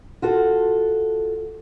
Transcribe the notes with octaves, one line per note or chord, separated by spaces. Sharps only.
F4 F#4 A4